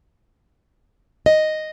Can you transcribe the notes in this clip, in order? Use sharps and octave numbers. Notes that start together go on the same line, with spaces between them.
D#5